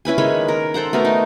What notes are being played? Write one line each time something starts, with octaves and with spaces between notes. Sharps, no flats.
C#4 E4 B4 G#5
D#3 G#3 C#5 B5
A#4
A4 C5 F#5 A#5
A3 B3 F#4 A#4
D#4